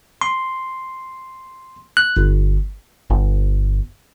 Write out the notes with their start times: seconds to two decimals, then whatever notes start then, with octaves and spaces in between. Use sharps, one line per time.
0.21 C6
1.97 F#6
2.17 G1
3.10 G1